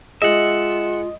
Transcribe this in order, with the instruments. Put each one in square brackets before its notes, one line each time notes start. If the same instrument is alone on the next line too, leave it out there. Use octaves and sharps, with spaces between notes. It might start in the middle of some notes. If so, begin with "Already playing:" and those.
[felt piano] G#3 [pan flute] F4 [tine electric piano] D#5 [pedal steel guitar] E5 F#5